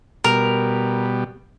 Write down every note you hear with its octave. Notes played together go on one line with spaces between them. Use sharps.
B2 G3 A#4